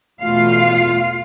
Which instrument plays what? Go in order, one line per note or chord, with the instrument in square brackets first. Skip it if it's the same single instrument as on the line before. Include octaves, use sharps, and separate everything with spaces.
[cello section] E2 B2 A3 F4 F5